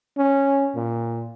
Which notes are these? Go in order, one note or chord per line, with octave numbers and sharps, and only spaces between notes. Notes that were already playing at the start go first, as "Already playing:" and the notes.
C#4
A#2